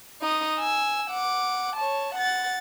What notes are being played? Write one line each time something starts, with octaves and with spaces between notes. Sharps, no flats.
D#4 D#6
G#5 E6
F#5 D6
C#5 A5
F#5 A6